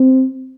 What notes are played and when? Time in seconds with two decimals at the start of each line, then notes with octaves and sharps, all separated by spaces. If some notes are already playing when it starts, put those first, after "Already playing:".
Already playing: C4